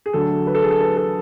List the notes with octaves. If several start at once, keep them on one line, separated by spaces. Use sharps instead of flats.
G#4
D2 D3 F#3 A4
B4
A4
G#4
A4
B4
A4